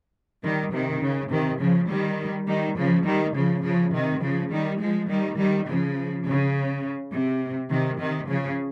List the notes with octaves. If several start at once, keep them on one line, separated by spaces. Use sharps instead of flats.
D#3 G3
C3 D#3
C#3
C3 D#3
C#3 F3
D#3 G3
D#3 G3
C#3 F3
D#3 G3
C#3 F3
C#3 F3
C3 D#3
C#3 F3
D#3 G3
F3 G#3
D#3 G3
D#3 G3
C#3 F3
C#3
C3
C3 D#3
C3 D#3
C#3 F3